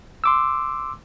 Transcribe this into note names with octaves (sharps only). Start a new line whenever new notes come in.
C6 D6 E6